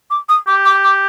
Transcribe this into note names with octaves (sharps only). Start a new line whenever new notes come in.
D6
D#6
G4 D6
D6
D6